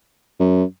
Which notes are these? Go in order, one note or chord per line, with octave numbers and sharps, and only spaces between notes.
F#2